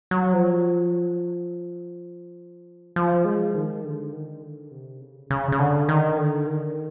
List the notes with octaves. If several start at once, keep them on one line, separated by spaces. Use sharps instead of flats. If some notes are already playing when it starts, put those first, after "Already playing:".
F#3
F3
F3
G#3
D#3
D3
D#3
D3
C3
C#3
C#3
C#3
D3
D#3
D3
D#3